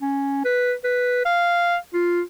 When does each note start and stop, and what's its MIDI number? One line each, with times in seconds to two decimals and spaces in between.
0.02 0.41 61
0.45 0.74 71
0.84 1.22 71
1.25 1.76 77
1.93 2.21 65